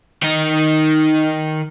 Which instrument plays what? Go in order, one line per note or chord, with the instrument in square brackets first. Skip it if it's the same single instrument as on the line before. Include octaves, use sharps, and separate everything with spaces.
[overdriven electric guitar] D#3 D#4